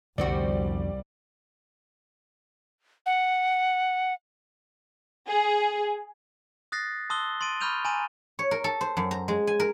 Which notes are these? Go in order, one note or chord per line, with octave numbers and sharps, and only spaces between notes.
C2 F2 D3 G3 B3 C4 F#4 D5
F#5
G#4
D#6 F#6 A6 A#6 C7
A5 C6 D#6 E6 F#6 G7
C6 A6 D7 D#7
B5 C#6 F6 G6 D#7 F7
G#5 A#5 C6 D#7
C#5
A#4
A4
C5
F#2
A#5
G#3
G#5
A#4